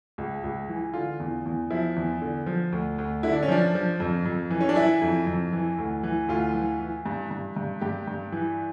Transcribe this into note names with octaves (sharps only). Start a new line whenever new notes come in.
C#2
C#2
E3
D3 F4
E2
E2
F3 E4
E2
D3
F3
D2
D2
D3 E4
D4
C#4
F3 D4
F3
F2
F2
E3
C#4
D4
E3 E4
F2
F2
E3
D2
E3
D2 F4
E3
E3
G2
G2
G2
G2 G4
G2
E3